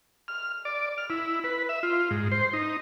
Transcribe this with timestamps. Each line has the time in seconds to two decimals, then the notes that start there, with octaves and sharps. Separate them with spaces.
0.28 F6
0.65 D5
0.98 F6
1.10 E4
1.44 B4
1.69 E5
1.83 F4
2.11 G#2
2.31 C5
2.53 D#4